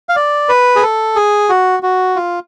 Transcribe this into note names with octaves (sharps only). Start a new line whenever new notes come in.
F5
D5
B4
G#4
A4
G#4
F#4
F#4
F4